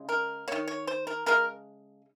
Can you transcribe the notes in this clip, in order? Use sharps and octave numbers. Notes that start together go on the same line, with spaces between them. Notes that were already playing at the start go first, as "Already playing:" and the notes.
Already playing: C#3 G#3
A#4
D#3 A#3 C#5
C#5
C5
A#4
C#3 G#3 A#4